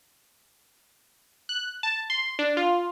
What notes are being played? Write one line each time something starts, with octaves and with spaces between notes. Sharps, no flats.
F#6
A5
C6
D4
F4